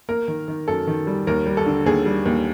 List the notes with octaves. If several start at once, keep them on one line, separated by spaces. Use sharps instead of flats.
A#3 A#4
D#3
D#3
F#2 A4
D#3
G3
D#2 A#4
G3
A4
D3
D#2 G#4
G3
D#2